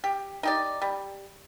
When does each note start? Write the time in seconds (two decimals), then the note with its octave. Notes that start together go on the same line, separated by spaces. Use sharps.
0.04 G4
0.43 D#4 G4 D5
0.82 G3